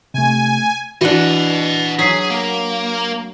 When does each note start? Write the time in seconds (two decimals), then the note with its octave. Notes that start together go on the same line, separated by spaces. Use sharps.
0.14 C3 A3 G#5
1.01 E3 D4 F#4 D#5 F#5
1.99 F#3 G#4 B6 C7
2.30 A#3